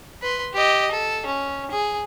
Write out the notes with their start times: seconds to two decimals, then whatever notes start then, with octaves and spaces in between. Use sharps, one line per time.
0.22 B4 C6
0.54 G4 D#5
0.91 A4
1.26 C#4
1.71 G#4